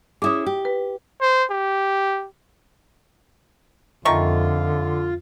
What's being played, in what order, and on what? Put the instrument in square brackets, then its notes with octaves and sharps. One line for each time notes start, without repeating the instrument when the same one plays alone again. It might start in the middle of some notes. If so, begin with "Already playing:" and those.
[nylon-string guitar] C#4 E4 G#4 [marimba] D6 D#6
[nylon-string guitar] G4
[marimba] B4
[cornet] C5
G4
[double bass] F2 [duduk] D3 [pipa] D#3 A3 C#6 [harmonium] F4